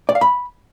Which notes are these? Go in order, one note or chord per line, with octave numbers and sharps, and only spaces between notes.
D5
F5
B5